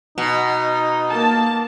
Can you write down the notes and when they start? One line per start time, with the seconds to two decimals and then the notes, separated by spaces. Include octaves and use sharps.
0.18 B2 D#4
1.10 A#3 A5